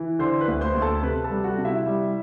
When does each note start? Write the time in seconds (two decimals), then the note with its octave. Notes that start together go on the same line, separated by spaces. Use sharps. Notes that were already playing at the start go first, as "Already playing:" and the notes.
Already playing: E3
0.19 D3 C5 C6
0.41 B4 B5
0.48 D2
0.61 C5 C6
0.75 D2
0.82 A4 A5
1.03 C3 B4 B5
1.24 A4 A5
1.30 G3
1.44 F#4 F#5
1.58 C3
1.65 E4 E5
1.87 G3